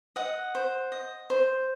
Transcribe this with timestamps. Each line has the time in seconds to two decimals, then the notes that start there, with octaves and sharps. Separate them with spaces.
0.16 D#5 F#5
0.55 C5
0.92 D#5
1.30 C5